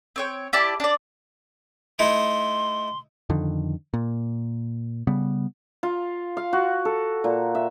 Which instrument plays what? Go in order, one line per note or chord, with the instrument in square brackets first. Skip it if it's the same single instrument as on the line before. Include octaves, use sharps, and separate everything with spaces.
[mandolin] C4 C#5 G5
E4 G4 D5 A5
D4 D5
[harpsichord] A3 D#4 E4 [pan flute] C6
[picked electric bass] F2 D3 D#3
A#2
C#3 G3 B3
[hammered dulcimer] F4
F5
F#4
A4
A#2
E5